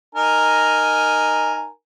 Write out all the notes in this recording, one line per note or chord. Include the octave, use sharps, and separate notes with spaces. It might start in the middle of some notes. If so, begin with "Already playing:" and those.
D#4 A#4 G#5